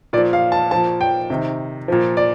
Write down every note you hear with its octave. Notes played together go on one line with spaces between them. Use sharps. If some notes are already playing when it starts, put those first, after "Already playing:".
A#2 F3 D5
F5
A5
A#2 F3 A5
G5
C3 D#3
A#2 F3
D5